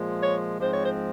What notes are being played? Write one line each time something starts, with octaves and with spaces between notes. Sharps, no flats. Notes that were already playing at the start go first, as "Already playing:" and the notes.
Already playing: A#2 F3 G#3
C#5
G#2 F3 G#3 C4 C5
C#5
C5